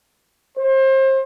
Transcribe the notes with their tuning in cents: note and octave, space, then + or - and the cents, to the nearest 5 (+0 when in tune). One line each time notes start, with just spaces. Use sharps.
C5 +30